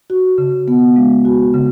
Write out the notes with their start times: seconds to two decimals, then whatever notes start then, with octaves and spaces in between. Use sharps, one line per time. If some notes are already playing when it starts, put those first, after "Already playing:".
0.10 F#4
0.38 C#3
0.68 B3
0.96 G#3
1.25 F#4
1.54 C#3